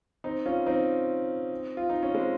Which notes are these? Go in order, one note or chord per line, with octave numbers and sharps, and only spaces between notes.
C4 D#4
C#4 F4
C4 D#4
F4
D#4
C#4
G#3 C4